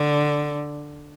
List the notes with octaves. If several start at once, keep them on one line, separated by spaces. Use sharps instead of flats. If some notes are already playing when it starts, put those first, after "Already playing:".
Already playing: D3